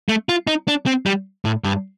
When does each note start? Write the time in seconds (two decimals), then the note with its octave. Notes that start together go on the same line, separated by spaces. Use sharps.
0.09 A3
0.29 F4
0.47 D#4
0.68 D4
0.86 C4
1.06 G3
1.45 A2
1.64 G2